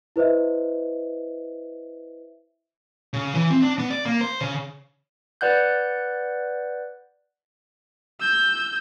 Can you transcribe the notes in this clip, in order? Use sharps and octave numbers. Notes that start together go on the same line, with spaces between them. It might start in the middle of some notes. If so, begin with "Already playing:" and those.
E4 B4 C5 D#5 E5
C#3
E3
C4
D4
B3
D5
A#3
C5
C#3
B4 D5 F#5 F#6 G6
E6 G6